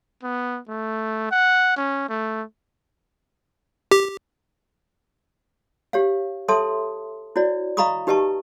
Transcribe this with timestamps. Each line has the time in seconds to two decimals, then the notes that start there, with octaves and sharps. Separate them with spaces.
0.23 B3
0.68 A3
1.31 F#5
1.76 C#4
2.09 A3
3.91 G4
5.93 G4 C#5 F5
6.48 A4 C#5 E5 A5 C6 D#6
7.36 E4 F#4 C#5 D5
7.77 D#5 F5 A#5 B5 C#6 D#6
8.07 D#4 G4 B4 D#5 A5 C#6